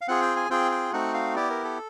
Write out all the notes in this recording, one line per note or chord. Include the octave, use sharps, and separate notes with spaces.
F5
C4 F4 G#4 F#5
G5
G#5
C4 F4 G#4 G5
G5
A3 C4 D#4 F#4 F#5
F5
B3 E4 G4 D5
A#4
A4